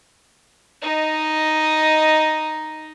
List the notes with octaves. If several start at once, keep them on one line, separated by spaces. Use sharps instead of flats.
D#4 D#5